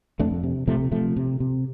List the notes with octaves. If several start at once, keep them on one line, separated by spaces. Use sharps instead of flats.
F2 A3 D4
C3
C3 F3 A3
C3 F3 A3
C3
C3